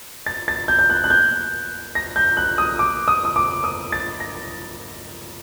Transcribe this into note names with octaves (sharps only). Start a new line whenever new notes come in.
A6
A6
G6
G6
F#6
F#6
G6
A#6
G6
F#6
D#6
D6
D#6
D#6
D6
D#6
A6
A#6